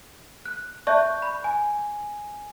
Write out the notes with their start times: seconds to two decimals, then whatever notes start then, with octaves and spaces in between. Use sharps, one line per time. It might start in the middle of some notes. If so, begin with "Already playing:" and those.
0.46 F#6
0.87 D5 E5 A5 C#6 F#6 G6
1.22 B5
1.44 G#5